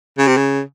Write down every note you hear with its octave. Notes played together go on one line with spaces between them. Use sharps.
C#3
C3
C#3